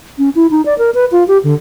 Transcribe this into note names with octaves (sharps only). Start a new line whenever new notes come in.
C#4
E4
D#4
D5
A#4
B4
F4
G4
D3